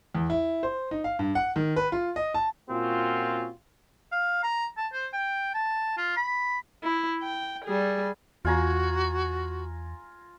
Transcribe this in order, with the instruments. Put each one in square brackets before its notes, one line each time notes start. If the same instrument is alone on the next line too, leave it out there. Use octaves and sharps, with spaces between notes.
[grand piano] E2
E4
C5
D#4
F5
G2
F#5
D#3
B4
F4
D#5
A5
[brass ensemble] A#2 C4 C#4 F4 F#4
[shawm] F5
A#5
A5
C5
G5
A5
F4
B5
[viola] E4
G5
G3 G#4
[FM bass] E2 [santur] F4 G#5 A#5 [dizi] F#4